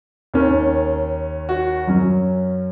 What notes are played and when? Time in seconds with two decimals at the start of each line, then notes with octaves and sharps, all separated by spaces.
0.34 D#2 D#3 A#3 C#4
1.49 F#4
1.87 F#2 F#3 C#4